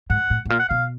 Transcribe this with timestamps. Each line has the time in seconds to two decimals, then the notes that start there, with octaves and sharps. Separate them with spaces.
0.10 G#2 F#5
0.30 A2
0.45 A2
0.50 A#2 F5
0.59 F#5
0.69 B2 F5